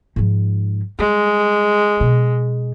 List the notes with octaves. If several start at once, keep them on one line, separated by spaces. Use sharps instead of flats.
G#2 F3
G3 G#3
B2